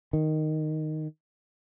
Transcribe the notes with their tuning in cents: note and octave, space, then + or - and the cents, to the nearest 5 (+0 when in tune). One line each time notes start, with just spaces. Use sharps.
D#3 -5